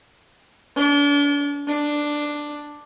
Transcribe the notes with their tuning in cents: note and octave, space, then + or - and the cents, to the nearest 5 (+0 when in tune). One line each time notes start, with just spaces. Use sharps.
D4 -40
D4 +5